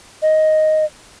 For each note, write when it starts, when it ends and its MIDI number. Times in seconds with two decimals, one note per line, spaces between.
0.22 0.85 75